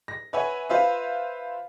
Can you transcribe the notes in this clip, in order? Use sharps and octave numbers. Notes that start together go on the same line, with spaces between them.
A#6
B4 C#5 E5 F#5 G#5
F4 B4 C5 E5 F5